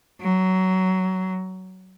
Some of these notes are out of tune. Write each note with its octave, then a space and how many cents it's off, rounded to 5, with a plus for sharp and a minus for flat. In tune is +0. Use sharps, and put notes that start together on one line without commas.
F#3 +15